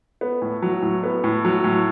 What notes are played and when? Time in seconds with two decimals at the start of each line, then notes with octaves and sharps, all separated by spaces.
0.21 B3
0.42 A2
0.62 F#3
0.82 A2
1.03 B3
1.24 A2
1.45 F#3
1.64 A2